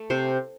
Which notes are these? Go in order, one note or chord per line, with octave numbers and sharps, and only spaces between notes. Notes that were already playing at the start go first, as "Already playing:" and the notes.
Already playing: A3
C3 C5